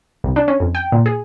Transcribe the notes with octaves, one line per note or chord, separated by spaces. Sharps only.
C2
D4
C#4
F2
G5
A#2
G#4